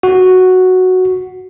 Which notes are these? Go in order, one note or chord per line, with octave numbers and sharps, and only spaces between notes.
F#4